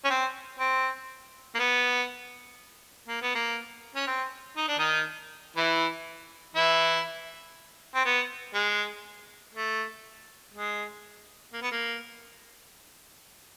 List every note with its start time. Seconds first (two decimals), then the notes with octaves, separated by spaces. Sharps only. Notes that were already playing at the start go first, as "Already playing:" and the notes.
0.05 C#4
0.10 C4
0.59 C4
1.55 A#3
1.59 B3
3.08 A#3
3.22 B3
3.35 A#3
3.96 C#4
4.07 C4
4.57 D#4
4.68 D4
4.78 D#3 D#4
5.56 E3 E4
6.56 E3 E4
7.95 C4
8.05 B3
8.54 G#3
9.54 A3
10.54 G#3
11.53 A#3
11.62 B3
11.71 A#3